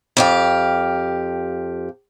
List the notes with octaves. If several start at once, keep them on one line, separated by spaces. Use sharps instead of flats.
F2 G4 F5